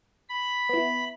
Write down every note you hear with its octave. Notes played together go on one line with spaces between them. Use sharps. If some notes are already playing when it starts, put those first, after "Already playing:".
B5
B3 E4